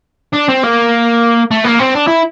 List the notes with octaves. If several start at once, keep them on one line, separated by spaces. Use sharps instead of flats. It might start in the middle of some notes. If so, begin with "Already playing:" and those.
D4
C4
A#3
A3
A#3
C4
D4
E4